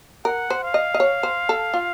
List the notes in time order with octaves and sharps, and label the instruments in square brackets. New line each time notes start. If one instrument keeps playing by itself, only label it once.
[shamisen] A#4 [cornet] F#5
[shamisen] C5
[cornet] F5
[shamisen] D#5
D#5
C#5
C5
A4
F4